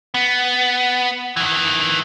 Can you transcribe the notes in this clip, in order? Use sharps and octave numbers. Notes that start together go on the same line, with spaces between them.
B3
D#3 E3